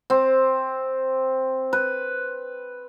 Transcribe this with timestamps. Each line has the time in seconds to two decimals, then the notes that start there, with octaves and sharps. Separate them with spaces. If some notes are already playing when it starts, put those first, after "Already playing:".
0.10 C4
1.73 B4